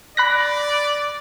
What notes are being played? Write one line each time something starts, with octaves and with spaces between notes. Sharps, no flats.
D5 B5 F#6 A#6